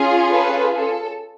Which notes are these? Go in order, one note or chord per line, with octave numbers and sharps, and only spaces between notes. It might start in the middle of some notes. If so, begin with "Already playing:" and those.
Already playing: C#4 F4 G#4
A4 B4
A4